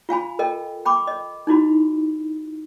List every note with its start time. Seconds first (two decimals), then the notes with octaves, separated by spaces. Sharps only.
0.09 F4 F5 G#5 B5
0.39 A4 A#4 D#5 G5
0.86 G5 B5 D6
1.07 D#5
1.47 D#4 E4 F#4 B5